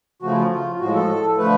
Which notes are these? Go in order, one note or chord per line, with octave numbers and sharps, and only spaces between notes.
C#3 F3 A3 F#4
E4
F4
F4
A2 F3 G#3 F#4
A4
D3 F3 A3 B4